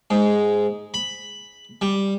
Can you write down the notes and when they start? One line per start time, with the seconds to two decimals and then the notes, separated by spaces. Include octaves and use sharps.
0.10 G#2
0.94 B5
1.82 G3